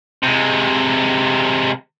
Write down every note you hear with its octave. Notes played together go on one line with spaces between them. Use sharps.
C3 G#3